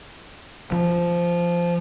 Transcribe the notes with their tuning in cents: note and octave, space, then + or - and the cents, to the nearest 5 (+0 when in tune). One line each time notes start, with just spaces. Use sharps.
F3 -10